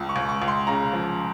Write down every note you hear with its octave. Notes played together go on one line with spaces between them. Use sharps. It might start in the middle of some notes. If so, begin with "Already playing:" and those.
Already playing: C#2
C#6
C#2
C#6
C#2
C6
C#3 A#5
F3